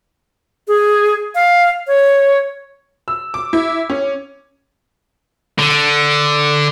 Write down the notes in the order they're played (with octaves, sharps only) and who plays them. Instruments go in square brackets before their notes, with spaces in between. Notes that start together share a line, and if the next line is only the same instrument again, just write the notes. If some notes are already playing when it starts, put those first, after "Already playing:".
[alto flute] G#4
F5
C#5
[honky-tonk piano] E6
D6
E4
C#4
[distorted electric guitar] D3